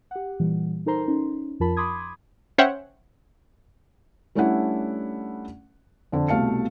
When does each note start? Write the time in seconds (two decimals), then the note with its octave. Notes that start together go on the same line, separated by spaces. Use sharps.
0.11 G4 F#5
0.39 A#2 E3 G3
0.86 D#4 A4 A#4 C5 A#5 C6
1.08 C#4 D#4
1.60 F2 F3 F4 A#4 A5 B5
1.77 B5 C6 D6 D#6 G#6
2.58 C#4 C5 C#5 E5 F#5 G5
4.35 G3 A3 C#4 D4 E4 F#5
6.12 F2 D3
6.28 C2 B2 A3 F5 A5 C#7